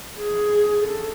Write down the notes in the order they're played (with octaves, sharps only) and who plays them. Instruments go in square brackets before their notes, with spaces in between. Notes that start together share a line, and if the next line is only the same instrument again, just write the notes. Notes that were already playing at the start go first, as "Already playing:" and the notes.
[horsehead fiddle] G#4
A4